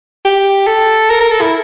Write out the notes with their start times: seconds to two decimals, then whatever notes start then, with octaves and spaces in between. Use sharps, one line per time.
0.25 G4
0.67 A4
1.10 A#4
1.20 A#4
1.31 A4
1.41 E4